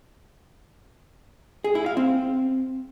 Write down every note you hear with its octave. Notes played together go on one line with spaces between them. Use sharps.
G#4
E4
F5
C4